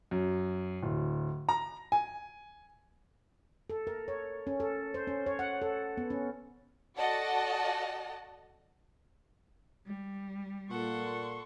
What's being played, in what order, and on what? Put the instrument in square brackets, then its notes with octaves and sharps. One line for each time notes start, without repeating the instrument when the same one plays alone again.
[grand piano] F#2
D1
A#5
G#5
[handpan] A4
A#4
C#5
C#4
A4
C5
C#4
C#5
F#5
A4
B3
C#4
[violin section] F#4 A4 D5 D#5 F#5 A5
[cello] G3
[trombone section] A#2 [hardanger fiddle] A4 F#5 [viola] C6 C#6